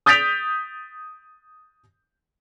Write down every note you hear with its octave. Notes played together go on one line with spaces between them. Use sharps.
D#6 G6 A6 B6 D7 F7